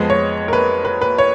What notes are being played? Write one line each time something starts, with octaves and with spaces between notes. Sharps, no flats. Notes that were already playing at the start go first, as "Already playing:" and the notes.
Already playing: F2 F3 G#3 B3 D#5
C#5
A#4
B4
B4
B4
C#5